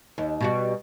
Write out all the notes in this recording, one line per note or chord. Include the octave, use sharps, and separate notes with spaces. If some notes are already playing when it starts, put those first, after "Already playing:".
D#2
B2 G3 F#4